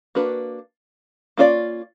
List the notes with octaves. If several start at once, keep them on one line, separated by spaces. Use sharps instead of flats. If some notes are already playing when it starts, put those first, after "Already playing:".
A#3 D4 F#4 B4
A#3 C#4 F4 A4 D5